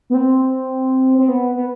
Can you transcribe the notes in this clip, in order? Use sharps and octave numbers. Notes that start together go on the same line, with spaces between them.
B3
C4
C4
B3
B3